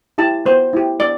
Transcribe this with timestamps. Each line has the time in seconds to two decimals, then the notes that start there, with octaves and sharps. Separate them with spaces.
0.18 E4 G4 A5
0.46 B3 C5
0.73 E4 G4
0.99 B3 D5